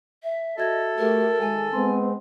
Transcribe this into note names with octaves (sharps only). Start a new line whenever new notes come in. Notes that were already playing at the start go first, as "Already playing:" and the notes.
E5
F#4 A4 D#5 E5 G#6
A3 G4 A#4
D#3 G#3 G#5
G#3 B3 C4 C6